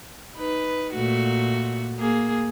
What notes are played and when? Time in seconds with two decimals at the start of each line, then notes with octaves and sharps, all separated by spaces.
0.35 D#4 B4
0.94 A#2 A3 F#4
1.98 A#3 G#4